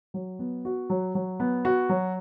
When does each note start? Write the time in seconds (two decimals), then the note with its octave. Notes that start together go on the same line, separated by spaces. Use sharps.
0.14 F#3
0.39 B3
0.65 F#4
0.90 F#3
1.15 F#3
1.40 B3
1.65 F#4
1.89 F#3